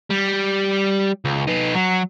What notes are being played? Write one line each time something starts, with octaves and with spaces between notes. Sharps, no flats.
G3
C#2
D#4 B4
F#3